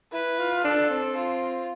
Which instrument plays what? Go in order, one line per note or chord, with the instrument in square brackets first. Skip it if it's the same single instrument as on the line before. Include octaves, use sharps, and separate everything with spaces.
[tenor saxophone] E4 [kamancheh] B4
[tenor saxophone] F4
[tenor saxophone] D4 [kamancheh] A4
[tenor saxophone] C4
[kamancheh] F4